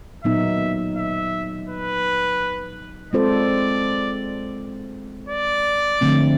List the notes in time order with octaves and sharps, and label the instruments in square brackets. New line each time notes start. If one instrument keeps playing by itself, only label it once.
[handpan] A#2 F#3 B3 D#4 [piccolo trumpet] E5
[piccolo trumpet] E5
B4
[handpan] G#3 C4 F4 A4 C5 [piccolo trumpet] D5
[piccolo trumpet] D5
[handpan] D3 F3 A3 C4